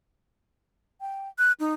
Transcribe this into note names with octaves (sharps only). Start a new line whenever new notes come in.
G5
F#6
D#4